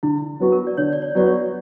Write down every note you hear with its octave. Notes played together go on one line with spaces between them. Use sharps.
D3 E4
F#3 B3 F#4
A#4
D5
D3 C#5
D5
C#5
F#3 B3 F#4 D5
C#5